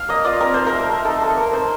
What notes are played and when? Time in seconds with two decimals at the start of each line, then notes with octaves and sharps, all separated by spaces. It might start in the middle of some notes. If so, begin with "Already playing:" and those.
Already playing: F5
0.08 A#3 D#5
0.24 F4 D5
0.40 C4 A#4
0.54 D#4 C5
0.67 A#4
0.73 A3
0.89 A3
1.05 D#4 A4
1.21 A#3 A4
1.36 A#3 A#4
1.53 D#4 C5